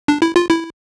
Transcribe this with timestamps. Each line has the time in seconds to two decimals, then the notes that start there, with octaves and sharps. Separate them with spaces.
0.08 D4
0.22 E4
0.36 F4
0.50 E4